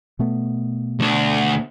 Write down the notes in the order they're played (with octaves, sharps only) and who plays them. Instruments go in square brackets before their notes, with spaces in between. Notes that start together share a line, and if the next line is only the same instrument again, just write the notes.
[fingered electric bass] B2 A3 B3
[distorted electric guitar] D2 D4